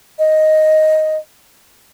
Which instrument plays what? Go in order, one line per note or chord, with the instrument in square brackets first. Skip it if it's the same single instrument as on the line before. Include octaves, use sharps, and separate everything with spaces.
[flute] D#5